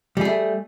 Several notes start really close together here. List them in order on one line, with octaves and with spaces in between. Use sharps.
G3 G#4 A3